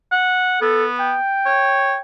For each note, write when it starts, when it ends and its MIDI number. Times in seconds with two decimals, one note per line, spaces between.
0.12 0.61 78
0.62 1.14 59
0.62 0.86 69
0.99 2.02 79
1.46 1.96 73